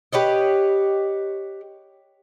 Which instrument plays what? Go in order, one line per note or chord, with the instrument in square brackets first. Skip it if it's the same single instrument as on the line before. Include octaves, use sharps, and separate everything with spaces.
[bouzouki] G4 B4 C#5 D#5